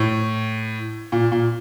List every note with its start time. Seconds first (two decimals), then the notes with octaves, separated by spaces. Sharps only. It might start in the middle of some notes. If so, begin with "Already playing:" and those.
Already playing: A2
1.12 A#2
1.32 A#2